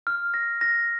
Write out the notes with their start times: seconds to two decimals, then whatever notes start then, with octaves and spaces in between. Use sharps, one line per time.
0.07 F6
0.34 A#6
0.61 A#6